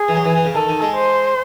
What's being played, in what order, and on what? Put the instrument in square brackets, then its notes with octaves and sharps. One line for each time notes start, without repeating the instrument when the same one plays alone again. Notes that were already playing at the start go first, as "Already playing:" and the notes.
Already playing: [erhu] G#4
[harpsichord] E3
F#3
E3
E3
C#3
[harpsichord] D#3 [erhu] A4
[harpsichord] D#3
G#3
[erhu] C5